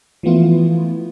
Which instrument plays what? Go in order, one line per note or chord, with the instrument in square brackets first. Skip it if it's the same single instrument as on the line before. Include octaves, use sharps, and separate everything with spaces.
[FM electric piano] E3 F3 A3 B3 E4 F4